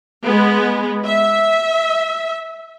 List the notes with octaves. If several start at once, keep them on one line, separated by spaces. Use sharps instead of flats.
G#3 B3
E5